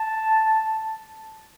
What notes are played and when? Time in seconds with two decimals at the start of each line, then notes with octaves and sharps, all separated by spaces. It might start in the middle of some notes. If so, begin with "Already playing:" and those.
Already playing: A5